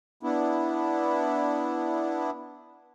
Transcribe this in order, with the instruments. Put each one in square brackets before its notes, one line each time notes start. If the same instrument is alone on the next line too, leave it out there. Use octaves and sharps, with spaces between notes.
[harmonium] B3 D4 E4